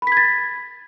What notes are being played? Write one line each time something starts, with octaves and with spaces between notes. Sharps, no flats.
B5 G#6 A6 B6